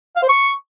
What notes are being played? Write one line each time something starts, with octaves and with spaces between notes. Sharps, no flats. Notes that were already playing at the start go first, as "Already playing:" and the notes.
F5
C5
C#6